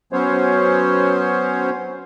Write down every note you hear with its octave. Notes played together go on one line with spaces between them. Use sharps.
F#3 B3 C#4 C5 C#5